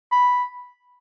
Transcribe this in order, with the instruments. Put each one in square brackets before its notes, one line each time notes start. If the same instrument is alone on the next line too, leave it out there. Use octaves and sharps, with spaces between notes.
[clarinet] B5